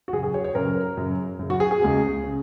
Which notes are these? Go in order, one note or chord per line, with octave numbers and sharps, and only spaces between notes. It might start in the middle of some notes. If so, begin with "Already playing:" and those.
F#4
F#2 C#3 G#4
G#4
C#5
C#5
F#2 C#3 A#4
F#2 C#3
F#2 C#3
F#4
G#4
G#4
C#2 C#3
C#3